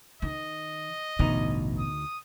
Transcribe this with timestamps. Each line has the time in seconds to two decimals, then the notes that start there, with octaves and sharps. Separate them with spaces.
0.22 D#3 D#5
1.19 A1 D2 G2 B2 D#4
1.78 D#6